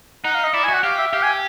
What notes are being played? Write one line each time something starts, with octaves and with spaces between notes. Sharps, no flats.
D#4 F#5
F5
D#5
E4 D5
G#5
F#4
F#5
G4 F5
E5
G4 F5
G#5